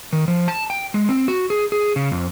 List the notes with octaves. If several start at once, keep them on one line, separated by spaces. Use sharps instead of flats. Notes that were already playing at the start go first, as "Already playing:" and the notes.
D#3
F3
A5
G5
G#3
C4
F#4
G#4
G#4
C#3
F2